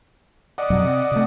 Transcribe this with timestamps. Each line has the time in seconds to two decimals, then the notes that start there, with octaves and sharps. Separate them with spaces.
0.58 D5 D#5 F#5
0.70 F2 B2 F#3
0.83 C3
1.12 C3 A3